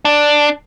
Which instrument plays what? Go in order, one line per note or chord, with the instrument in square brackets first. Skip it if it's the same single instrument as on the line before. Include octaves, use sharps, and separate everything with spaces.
[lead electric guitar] D4